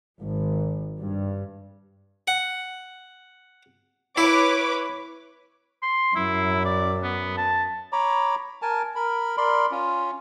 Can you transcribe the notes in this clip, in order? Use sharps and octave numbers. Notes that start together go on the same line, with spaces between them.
G#1
G2
F#5
E4 B4 C#5 D6
C6
F#2 E4
D5
B3
A5
C#5 A#5 B5 D6
A#4 G#5 A5
A#4 B5
A#4 D5 B5 C6
C#4 F4